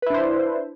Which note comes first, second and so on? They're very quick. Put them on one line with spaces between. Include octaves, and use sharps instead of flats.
B4 E4 D4 C5